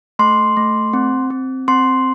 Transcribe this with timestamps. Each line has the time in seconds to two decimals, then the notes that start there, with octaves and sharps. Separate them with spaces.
0.19 A3 C6
0.57 A3
0.93 C4
1.30 C4
1.68 C4 C6